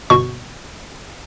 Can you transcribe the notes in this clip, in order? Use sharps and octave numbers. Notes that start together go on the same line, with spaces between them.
G1 B2 C#6